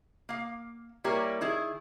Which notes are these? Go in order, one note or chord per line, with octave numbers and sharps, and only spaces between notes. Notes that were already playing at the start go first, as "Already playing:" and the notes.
A#3 F5
G3 A#3 E4 G4 A#4 C#5
D#3 E4 G#4